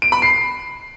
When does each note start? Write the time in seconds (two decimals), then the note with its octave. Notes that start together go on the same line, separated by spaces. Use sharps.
0.02 D7
0.12 B5
0.22 C7